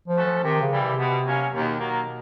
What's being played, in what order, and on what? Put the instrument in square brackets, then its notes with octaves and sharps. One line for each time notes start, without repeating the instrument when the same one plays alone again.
[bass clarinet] F3
[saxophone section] A3 C#4 F#4 A4
[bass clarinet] F3
[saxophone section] C3 [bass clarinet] D#3
[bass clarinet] C#3
[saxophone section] E3 G3
[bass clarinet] C3
[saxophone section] B2
F#3 A#3 C#4
[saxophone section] D#2 [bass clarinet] B2
[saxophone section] D#3 F#3 A#3